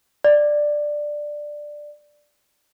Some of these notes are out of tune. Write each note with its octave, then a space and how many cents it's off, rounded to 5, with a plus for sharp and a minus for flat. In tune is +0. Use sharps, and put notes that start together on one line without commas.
D5 +10